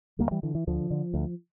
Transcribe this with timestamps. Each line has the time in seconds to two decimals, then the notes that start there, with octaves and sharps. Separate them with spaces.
0.19 D2 G3 A#3
0.31 E3 G3
0.43 D3 E3
0.55 E3
0.67 D2 D3 F3
0.91 D3
1.14 D2